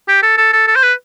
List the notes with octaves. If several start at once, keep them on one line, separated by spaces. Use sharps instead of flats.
G4
A4
A4
A4
A4
C5
B4